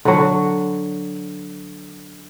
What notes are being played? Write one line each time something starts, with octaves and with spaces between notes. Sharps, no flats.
D3 F#3